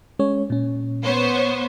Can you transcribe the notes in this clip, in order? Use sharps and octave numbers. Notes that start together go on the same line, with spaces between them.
G#3 C#4 C#5
A#2 C#4
B3 C5 C#5